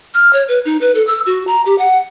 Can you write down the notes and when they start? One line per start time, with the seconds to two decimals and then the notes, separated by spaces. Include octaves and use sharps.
0.14 F6
0.33 C#5
0.48 B4
0.65 D#4
0.81 B4
0.95 A4
1.07 E6
1.26 F#4
1.47 A#5
1.66 G4
1.78 F#5